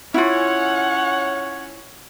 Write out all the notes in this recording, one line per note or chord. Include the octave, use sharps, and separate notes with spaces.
C#4 E4 F4 C#5 F#5